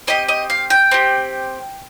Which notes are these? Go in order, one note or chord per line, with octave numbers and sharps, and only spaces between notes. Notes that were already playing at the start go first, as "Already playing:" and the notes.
C4 G4 D#5
D#5
F5
G5
C4 G4